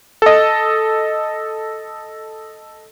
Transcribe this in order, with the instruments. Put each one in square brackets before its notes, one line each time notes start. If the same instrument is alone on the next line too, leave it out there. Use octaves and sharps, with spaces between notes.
[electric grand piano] A4 D#5